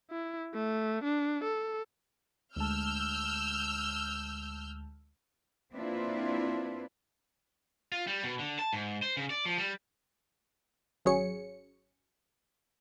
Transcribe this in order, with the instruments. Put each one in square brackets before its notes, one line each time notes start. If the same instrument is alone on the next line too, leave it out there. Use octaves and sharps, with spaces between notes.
[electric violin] E4
A3
D4
A4
[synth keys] D2 G#3 A5 [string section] E6 F6 G6
[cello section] A#3 C4 D4 E4 F4 B4
[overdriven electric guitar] F4
G3
B2
D3
A5
G#2
C5
C#3
D5
F3
G3
[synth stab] G#1 F#3 C#4 G#4 C#5 C#7